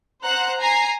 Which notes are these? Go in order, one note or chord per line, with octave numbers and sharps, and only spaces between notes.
C5 F#5 A#5 F#6
G#5 A#5 C7